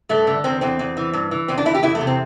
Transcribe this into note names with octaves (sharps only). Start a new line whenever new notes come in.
G2 A3
D3
E2 C4
E2 C4
E2
E3
G2
E3
E2 C4
D4
E2 E4
G4
E2 E4
A3
C3
C4